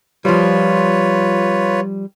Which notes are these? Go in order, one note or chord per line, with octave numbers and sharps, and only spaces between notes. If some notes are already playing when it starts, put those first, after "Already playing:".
F3 G3 F4 B4 C#5